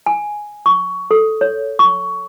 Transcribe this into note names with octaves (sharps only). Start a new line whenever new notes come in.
G#5
C#6
A4
C#5
C#6